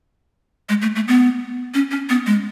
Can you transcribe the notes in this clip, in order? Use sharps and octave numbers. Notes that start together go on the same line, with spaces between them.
G#3
A3
A3
B3
C#4
C#4
B3
G#3